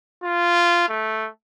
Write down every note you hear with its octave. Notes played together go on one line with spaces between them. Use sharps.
F4
A3